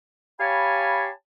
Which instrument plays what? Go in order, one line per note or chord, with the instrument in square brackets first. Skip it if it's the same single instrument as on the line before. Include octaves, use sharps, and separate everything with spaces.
[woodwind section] G4 C#5 F5 G#5 A5 B5